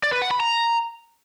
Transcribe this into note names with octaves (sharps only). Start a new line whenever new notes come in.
D5
B4
F#5
B5
A#5